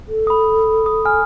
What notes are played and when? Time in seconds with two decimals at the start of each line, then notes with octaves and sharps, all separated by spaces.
0.08 A4
0.27 B5 D#6
0.86 D#6
1.05 G#5 F6